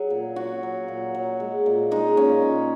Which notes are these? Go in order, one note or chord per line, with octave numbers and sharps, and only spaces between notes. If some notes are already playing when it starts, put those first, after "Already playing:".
Already playing: F#3 G#4
A#2
F#3 F#4
F#3
A#2
F#3
G#3
A#2
G#3 D#4
A#2 C#4
A#2